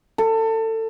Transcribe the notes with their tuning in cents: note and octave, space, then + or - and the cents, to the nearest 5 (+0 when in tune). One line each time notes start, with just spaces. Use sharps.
A4 +25